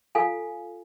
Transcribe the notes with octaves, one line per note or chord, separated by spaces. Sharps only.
F4 A4 F5 G#5